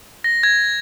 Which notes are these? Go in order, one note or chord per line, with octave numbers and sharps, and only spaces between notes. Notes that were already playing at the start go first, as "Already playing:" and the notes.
A#6
G#6